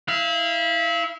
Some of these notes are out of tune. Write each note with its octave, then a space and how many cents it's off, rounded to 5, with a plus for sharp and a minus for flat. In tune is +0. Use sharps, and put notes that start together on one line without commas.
E4 -25 F5 -30